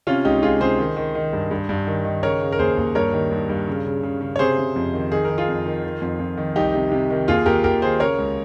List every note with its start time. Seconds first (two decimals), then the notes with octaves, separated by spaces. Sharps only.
0.07 C3 C#4 F4
0.25 C#2 D#4 G4
0.43 C#2 F4 G#4
0.60 C3 G#4 C5
0.79 D#3
0.97 D#3
1.15 D#3
1.33 G2
1.51 G2
1.69 G2
1.87 D#3
2.05 D#3
2.23 C#3 A#4 C#5
2.41 C#3
2.52 A#4
2.59 D#2 G#4 C5
2.77 D#2
2.95 G2 A#4 C#5
3.13 D#3
3.31 G2
3.49 G2
3.68 C#3
3.85 C#3
4.03 C#3
4.21 C#3
4.36 C#5
4.39 C3 G#4 C5
4.58 C3
4.76 F2
4.93 D#3
5.12 D#3 G#4
5.25 D#3 A#4
5.38 F4 G#4
5.48 F2
5.66 D#3
5.84 D#3
6.02 F2
6.19 F2
6.37 D#3
6.56 C2 D#4 G4
6.74 C3
6.92 C3
7.10 D#3
7.28 D#2 F4 G#4
7.46 D#2 G4 A#4
7.64 D#2 G4 A#4
7.82 D#3 G#4 C5
8.00 C#3 A#4 C#5
8.19 C#2